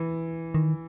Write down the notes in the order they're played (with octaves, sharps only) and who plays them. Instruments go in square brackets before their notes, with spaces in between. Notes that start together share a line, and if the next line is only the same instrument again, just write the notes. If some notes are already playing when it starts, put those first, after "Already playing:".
Already playing: [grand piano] E3
[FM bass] D#3